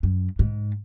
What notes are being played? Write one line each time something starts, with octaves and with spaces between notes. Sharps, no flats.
F#2
G#2